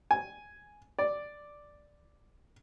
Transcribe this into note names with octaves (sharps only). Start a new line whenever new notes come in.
G#5
D5